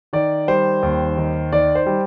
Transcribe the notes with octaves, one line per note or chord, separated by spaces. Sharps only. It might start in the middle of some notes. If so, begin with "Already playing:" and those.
D#3 D5
G3 C5
D#2
D#3
D#3 D5
C5
G3